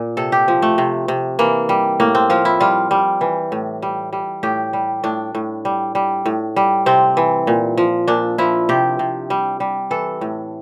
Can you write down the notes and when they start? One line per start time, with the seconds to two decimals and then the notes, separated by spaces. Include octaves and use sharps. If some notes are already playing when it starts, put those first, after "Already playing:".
Already playing: A#2
0.17 C3 A4
0.32 G4
0.48 F3
0.62 A3
0.78 C3
1.08 C3
1.39 E3 A#3
1.69 G3
2.00 A2 A#3
2.15 C4
2.30 F3 F4
2.45 E4
2.60 G3 F4
2.91 G3
3.21 E3
3.52 A2
3.82 G3
4.13 G3
4.43 A2 G4
4.73 G3
5.04 A2 D4
5.35 A2
5.65 G3
5.95 G3
6.26 A2
6.56 G3
6.86 C3 C4
7.17 E3
7.47 A#2
7.77 F3
8.08 A#2 D4
8.38 F3 E4
8.69 C3 G4
8.99 C3
9.30 G3
9.60 G3
9.91 E3 A4
10.21 A2